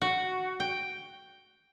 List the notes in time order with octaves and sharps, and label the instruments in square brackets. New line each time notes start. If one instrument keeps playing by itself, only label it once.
[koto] F#4
G5